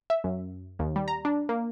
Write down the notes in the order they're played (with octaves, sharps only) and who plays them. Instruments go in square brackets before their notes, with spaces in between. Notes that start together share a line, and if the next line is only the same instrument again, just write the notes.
[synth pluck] E5
F#2
D#2
G3
A#5
D4
A#3